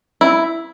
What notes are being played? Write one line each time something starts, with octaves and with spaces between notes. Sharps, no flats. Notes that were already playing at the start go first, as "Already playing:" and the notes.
C4 E4